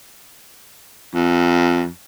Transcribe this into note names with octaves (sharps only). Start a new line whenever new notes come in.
F2